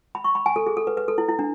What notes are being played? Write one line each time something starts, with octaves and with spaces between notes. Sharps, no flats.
B5
C#6
B5
G#5
A4
G#4
A4
B4
B4
A4
E4
E4
D4